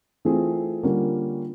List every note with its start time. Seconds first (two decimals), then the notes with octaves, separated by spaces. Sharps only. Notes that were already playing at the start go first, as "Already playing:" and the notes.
0.25 E3 A3 C4 F4 G#4
0.83 D3 G3 A#3 C#4 F4